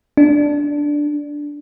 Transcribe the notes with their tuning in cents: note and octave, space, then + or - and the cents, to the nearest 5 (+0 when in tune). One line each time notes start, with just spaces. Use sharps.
D4 +0